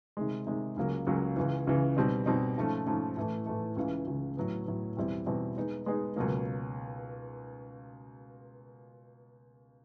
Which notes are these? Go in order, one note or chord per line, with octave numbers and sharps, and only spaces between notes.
C3 D#3 G#3
C3 D#3 G#3
C#2 C#3 F#3 A#3
C#2 C#3 F#3 A#3
C#2 C#3 E3
C#2 C#3 E3
B2 G3 C4 D#4
B2 G3 C4 D#4
G#2 F3 A3 C#4
G#2 F3 A3 C#4
A2 E3 A3
A2 E3 A3
C#2 C#3 E3
C#2 C#3 E3
A2 F#3 B3
A2 F#3 B3
E2 B2 G3 C4 E4
E2 B2 G3 C4 E4
G#3 B3 D#4 G#4
G#3 B3 D#4 G#4
C#2 B2 F#3 A#3